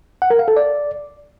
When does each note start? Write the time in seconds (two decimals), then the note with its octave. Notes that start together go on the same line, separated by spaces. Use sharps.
0.22 F#5
0.30 A#4
0.39 F5
0.48 A4
0.56 D5